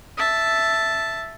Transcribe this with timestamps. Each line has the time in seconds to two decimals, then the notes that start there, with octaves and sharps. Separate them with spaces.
0.17 E5 A5